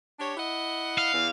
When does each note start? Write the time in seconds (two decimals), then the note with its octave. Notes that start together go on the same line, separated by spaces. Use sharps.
0.20 D4 G4 C#5
0.37 E4 D#5 F#5
0.98 F5
1.13 E2